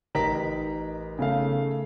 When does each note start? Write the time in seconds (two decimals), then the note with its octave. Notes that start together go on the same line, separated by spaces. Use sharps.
0.15 A1 D#4 A#4 D#5 A#5 B6
1.19 C#3 A3 F5